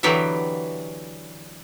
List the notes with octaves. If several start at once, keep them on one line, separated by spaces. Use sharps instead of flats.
D3 E3 F#3 B3 G4 E5